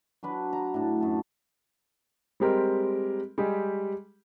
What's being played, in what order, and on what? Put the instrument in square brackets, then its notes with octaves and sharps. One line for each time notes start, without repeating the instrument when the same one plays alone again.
[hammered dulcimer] F#3 D4 B4
A#5
A2 D4
F#2 A4
[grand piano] G3 G#3 C4 G4 A#4
G3 G#3 G4 G#4